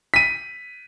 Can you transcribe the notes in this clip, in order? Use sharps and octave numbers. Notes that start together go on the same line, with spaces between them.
B6 D#7